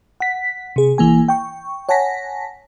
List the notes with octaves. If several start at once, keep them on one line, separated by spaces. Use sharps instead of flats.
F#5 B6
C3 G#4
B1 E3 A#3 G#5
G5 C#6
C#5 F#5 G#5 A5 A#6 B6